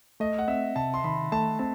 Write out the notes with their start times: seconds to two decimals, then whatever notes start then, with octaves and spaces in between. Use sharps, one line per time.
0.20 A3 D#5
0.38 F#5
0.48 C4 E5
0.76 C3 A5
0.94 C6
1.04 D#3 B5
1.32 A3 A5
1.59 C4 A5